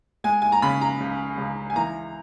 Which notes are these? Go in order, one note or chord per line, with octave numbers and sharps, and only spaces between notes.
G#3 G#5
G#5
A#5
C#3 B5
A#5
C#2
C#2
G#5
E3 A#5